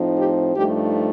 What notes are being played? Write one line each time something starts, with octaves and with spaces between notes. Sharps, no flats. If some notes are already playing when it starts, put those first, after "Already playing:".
Already playing: A2 F3 C4 D#4
G4
G2 F3 A3 D#4 G4